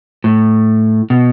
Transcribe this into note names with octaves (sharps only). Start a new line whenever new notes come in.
A2
B2